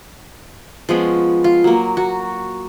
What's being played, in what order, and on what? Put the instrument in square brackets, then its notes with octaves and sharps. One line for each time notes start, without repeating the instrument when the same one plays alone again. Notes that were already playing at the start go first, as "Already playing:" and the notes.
[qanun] F3 G#3 B3 C#4
F4
F#3 A#3
F#4